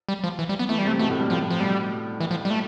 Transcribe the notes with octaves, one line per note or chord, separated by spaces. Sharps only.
G3
F3
E3
G3
B3
E3 A3
G3
C3
A3
B2 A3
A2
G2
A2 F3
F3
B2 G3
E3
F3
G3
A3